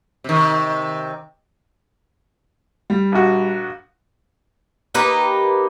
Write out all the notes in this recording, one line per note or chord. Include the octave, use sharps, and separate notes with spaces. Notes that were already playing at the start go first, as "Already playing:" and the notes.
C3 D#3
G3
A#1 F#4
A#3 D#4 G4 B4